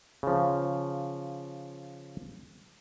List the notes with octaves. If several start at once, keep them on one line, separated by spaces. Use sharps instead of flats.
C#3 F3